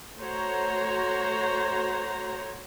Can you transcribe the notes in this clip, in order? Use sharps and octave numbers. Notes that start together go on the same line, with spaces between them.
A3 F#4 C5 C#5 A#5